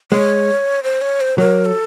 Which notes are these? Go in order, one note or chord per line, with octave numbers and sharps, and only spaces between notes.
G#3 C#5
C5
C#5
C5
F#3 A#4
A4